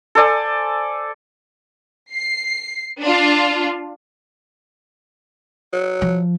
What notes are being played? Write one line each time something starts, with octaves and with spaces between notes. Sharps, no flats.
A4 C5 D5 G#5
C7
D4 F4
F#3
F3